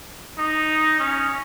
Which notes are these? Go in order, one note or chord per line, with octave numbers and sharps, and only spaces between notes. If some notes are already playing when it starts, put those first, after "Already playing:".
D#4
C#4